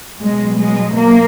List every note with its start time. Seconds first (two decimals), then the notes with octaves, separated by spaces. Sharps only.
0.20 B2 F#3 G#3
0.57 G#3
0.94 A#3